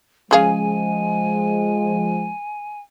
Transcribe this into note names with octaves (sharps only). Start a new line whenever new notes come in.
C#3 F3 G#3 G#4 F5 G#5